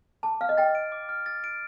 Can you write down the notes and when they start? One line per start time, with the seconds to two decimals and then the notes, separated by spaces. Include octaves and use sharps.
0.23 A5 D6
0.41 F5 F6
0.49 D#5
0.57 G5 A6
0.75 D7
0.92 D6
1.09 F6
1.26 A6
1.44 D7